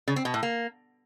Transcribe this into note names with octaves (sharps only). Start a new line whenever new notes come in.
C#3
C4
B2
A2
A#3